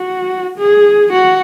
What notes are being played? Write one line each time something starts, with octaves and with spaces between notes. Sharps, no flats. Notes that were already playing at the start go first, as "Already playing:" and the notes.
Already playing: F#4
G#4
F#4